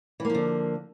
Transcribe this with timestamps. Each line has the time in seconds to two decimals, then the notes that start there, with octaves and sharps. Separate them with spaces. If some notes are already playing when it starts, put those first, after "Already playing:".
0.20 E3
0.25 A#3
0.30 F3
0.35 D3